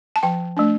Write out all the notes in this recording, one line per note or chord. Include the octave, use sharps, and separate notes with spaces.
A5
F3 G5
A3 D4